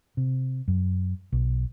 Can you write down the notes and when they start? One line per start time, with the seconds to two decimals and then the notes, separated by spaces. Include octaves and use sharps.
0.17 C3
0.68 F#2
1.32 B1